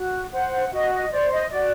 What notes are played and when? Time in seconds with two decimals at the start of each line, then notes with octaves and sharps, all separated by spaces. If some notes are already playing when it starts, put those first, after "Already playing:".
Already playing: F#4
0.32 C5 F#5
0.73 F#4 D#5
0.93 D#5
1.11 C5 D5
1.31 D#5
1.51 F#4 D5